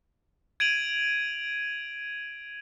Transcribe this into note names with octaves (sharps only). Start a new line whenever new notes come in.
G#6 D7 D#7 F7 F#7